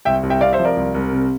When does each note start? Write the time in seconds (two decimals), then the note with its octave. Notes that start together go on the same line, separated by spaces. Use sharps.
0.05 C2 E5 G5
0.23 C2
0.30 E5 G5
0.41 C3 D5 F5
0.53 C5 E5
0.59 F3
0.65 A#4 D5
0.77 C2
0.94 C2
1.12 C3